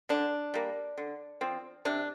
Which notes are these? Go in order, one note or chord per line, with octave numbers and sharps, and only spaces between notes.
D3 D4
G3 A#3
D3
F3 C4
C3 D4